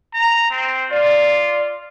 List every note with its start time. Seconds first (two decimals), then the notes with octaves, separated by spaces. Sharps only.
0.14 A#5
0.51 C4
0.91 F4 D5